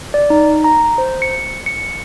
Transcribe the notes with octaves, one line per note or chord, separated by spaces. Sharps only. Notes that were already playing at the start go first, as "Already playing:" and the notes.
D5
D#4
A#5
C5
C#7
C#7